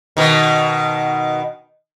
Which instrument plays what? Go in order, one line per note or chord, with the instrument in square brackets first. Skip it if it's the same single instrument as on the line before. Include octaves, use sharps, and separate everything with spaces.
[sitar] B2 D#3